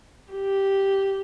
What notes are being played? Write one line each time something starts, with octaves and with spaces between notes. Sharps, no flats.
G4